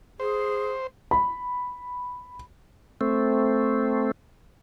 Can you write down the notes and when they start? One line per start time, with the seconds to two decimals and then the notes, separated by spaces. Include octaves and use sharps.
0.20 G#4 C5
1.11 B5
3.01 A3 C4